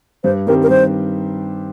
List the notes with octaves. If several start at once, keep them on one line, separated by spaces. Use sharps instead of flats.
G2 C5
D#3 G3 C4 G4 A#4
A#4
G2 C5